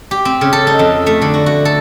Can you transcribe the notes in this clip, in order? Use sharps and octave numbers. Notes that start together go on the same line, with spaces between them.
G4
C4
C#3
A4
D#4
F2
A3
D3
F#4
F#4
A4